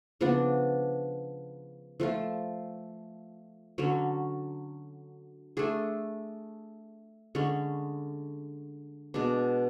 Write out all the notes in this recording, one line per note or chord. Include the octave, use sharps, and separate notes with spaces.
C#3 F3 B3 D4
F3 A3 F4
D3 F#3 C#4
A3 D4 G#4
D3 G#3 C#4
B2 G#3 D4